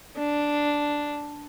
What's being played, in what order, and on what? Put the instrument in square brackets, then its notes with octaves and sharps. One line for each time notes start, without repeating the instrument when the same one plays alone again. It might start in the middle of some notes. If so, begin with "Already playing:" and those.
[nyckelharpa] D4